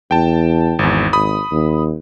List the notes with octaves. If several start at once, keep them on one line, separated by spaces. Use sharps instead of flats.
E2 G5 A5
G#1 E2
G#1 B5 D#6
D#2